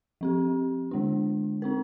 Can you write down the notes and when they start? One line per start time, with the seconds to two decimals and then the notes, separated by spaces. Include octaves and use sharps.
0.21 F3 C4 G4
0.91 D3 G#3 D4
1.62 C4 D#4 A#4